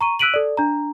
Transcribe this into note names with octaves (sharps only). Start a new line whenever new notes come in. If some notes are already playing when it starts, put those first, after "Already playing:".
A#5 C#6 D#7
E6 F#6 B6 D7 D#7 F#7
A4 D5
D4 A#5